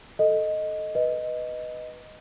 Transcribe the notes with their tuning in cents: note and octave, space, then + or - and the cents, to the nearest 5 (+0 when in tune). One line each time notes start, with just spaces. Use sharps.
A4 +0 D#5 +0
B4 +0 D#5 +0